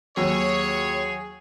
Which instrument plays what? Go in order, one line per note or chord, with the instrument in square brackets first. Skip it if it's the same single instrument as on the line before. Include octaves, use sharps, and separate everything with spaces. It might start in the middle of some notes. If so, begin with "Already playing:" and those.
[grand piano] D#2 E6 [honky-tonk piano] F#3 [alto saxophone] G#4 [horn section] C#5